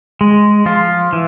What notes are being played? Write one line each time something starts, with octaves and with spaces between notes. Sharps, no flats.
G#3
F3 F4
E3